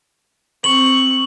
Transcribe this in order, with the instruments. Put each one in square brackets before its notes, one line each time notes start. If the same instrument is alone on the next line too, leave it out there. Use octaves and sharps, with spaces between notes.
[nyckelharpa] C4 C#6 [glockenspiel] F#7